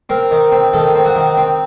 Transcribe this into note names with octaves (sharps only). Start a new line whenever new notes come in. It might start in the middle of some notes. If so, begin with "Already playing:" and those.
C4 A#4
D#3
C4
D#3 A4
C4
F#4
D#3
C4